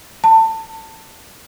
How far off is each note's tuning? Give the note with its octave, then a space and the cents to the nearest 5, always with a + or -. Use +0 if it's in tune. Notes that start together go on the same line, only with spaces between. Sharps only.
A5 +25